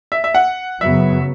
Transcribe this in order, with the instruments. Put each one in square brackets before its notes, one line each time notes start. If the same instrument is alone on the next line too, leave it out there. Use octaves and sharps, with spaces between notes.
[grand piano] E5
E5
F#5
[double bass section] F#2 C#3 F#3 B3 [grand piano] E5